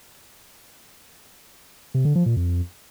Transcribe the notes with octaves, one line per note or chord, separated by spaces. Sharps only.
C3
D3
F3
A#2
F2